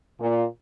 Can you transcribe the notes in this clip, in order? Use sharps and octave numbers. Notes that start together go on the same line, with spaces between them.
A#2